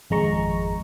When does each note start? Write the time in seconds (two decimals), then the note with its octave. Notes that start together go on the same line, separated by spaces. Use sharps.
0.10 G#1 F2 G#3 A#5 C#6